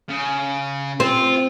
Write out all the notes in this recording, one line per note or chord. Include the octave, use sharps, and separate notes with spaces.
C#3
C4 F4